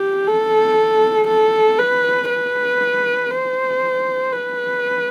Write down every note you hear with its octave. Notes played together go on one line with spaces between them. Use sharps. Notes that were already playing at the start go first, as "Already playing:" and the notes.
Already playing: G4
A4
A4
B4
B4
C5
B4